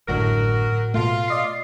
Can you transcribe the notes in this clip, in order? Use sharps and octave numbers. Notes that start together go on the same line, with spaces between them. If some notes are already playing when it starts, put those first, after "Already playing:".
G#1 F#2 A2 D3 F#3 F#4 A#4 A#6
B2 A3 F4
D5 D#5 C7